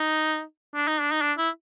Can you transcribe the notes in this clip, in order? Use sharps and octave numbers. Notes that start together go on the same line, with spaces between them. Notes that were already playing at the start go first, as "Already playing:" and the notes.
Already playing: D#4
D4
D#4
D4
D#4
D4
E4